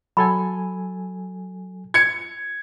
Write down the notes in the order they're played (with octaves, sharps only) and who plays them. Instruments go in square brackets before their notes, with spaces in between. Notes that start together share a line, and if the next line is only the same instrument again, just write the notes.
[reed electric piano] F#3 A4 G#5 [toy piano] B5
[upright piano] G#6 C#7